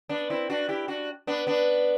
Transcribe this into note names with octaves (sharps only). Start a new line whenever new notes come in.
B3 D4
C4 E4
D4 F#4
E4 G4
D4 F#4
B3 D4
B3 D4